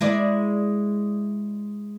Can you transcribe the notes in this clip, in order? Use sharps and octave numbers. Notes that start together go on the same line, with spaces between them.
G#3 E4 D5